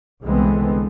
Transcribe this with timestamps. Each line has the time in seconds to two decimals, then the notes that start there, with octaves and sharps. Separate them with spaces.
0.24 C2 D3 E3 G#3 B3 C4